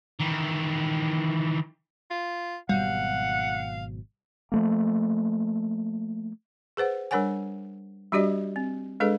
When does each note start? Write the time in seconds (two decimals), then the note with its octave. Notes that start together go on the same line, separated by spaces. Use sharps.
0.20 D#3 E3
2.10 F4
2.69 G#1 B2 F#3 G3 F5 F#5
4.52 F3 A3 A#3
6.77 G#4 B4 C5 F#5
7.11 G3 D4 A#4 C#5 F#5 G#5
8.12 G3 D4 F#4 G4 D5 D#5
8.56 C4
9.00 G#3 D4 G#4 A4 B4 D#5